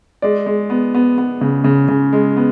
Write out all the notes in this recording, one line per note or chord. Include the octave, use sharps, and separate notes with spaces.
G#3 D5
G#3
B3
B3
B3
C#3
C#3
C#3
G#3
B3